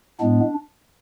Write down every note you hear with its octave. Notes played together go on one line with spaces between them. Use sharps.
A2 G#3 B3 D4